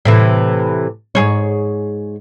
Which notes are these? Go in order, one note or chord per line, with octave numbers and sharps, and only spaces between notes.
A2 C3 E3
G#2 G#4 C#5